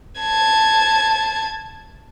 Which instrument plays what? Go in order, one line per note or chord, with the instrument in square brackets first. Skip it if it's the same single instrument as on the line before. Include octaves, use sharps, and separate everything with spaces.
[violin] A5 G#6